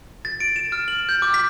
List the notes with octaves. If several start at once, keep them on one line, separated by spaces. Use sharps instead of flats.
A6
D7
E7
F6
F#7
G6
D6
B6